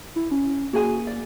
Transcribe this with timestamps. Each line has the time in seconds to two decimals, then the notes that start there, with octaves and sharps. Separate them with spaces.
0.16 E4
0.31 C#4
0.73 A#3 F#4 G#4 G#5
1.07 D5